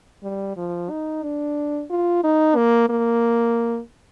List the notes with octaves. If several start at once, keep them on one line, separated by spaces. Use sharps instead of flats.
G3
F3
D#4
D4
F4
D#4
A#3
A#3